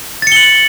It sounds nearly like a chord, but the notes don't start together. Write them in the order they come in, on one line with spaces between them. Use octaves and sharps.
A6 C#7 G7 F#7